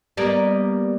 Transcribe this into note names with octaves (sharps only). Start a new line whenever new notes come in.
G3 A#3 B3